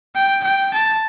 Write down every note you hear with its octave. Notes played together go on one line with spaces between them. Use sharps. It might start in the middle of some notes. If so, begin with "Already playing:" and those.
G5
G5
A5